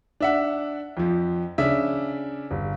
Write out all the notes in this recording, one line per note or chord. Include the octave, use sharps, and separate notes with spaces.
D4 E5 F#5
F2 F3
C#3 D4 E5
G1